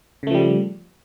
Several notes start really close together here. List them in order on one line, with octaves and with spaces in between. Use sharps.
C#3 A3 F3 G3